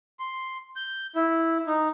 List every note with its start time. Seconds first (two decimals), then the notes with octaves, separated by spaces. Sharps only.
0.20 C6
0.76 G6
1.16 E4
1.67 D#4